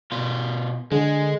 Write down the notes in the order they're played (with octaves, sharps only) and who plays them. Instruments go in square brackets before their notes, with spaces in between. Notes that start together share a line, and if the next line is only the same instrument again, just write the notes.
[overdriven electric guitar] B2 F4
[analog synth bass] D3 [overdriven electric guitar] G#3 [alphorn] G#4